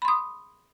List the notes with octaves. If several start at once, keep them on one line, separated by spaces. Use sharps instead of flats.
B5 C6 D#6